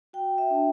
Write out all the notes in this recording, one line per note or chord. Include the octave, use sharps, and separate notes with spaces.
F#4 G5
E5
D4 A5